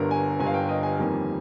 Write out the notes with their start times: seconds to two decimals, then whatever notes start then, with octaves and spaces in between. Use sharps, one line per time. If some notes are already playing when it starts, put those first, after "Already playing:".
Already playing: G1 G2 D3 A#4
0.11 G#5
0.39 G1 G2 D3 G#5
0.47 F5
0.54 G5
0.69 D#5
0.83 G#5
0.98 F2 D#3 G3 A#3